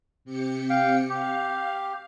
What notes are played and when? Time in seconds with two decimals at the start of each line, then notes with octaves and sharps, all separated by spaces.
0.25 C3 G4 C#7
0.70 F5 G5
1.09 G4 F5